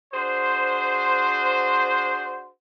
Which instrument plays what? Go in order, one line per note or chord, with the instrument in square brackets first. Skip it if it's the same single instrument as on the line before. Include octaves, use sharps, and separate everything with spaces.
[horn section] D4 F#4 G#4 C5